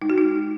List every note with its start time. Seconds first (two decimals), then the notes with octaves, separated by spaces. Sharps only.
0.02 G#3 D#4
0.10 F#4
0.18 D#4